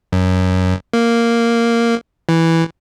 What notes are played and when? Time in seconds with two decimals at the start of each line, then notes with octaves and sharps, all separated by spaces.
0.12 F#2
0.93 A#3
2.29 E3